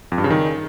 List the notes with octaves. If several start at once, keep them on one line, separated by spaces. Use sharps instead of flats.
F2
G2
C#3
D#3